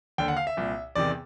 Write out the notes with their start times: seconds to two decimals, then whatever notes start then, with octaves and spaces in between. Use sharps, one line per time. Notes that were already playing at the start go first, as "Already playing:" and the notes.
0.18 D#2 D3 G5
0.28 F#5
0.37 F5
0.47 E5
0.57 C2 A#2
0.95 E2 C3 D#3 D5